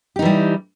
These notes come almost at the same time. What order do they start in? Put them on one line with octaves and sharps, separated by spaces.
G4 D#4 E3 G3